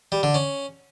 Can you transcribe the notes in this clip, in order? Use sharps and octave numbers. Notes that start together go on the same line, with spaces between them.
G3
D3
C#4